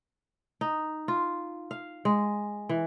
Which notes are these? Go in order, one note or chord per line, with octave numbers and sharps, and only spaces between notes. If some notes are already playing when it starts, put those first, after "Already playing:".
D#4
F4
F5
G#3
E3